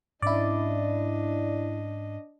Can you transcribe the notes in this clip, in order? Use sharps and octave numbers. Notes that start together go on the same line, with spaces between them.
G#2 C#4 D4 E4 D5 D#5